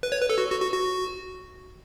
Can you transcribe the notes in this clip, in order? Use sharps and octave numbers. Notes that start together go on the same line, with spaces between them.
B4
C#5
B4
A4
F#4
F#4
F#4
F#4